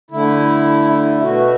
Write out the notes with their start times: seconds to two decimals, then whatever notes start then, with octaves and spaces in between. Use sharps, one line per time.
0.10 D3 A3 E4
1.22 B2 A3 F#4